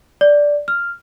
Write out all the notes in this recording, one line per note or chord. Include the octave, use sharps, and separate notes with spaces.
D5
F6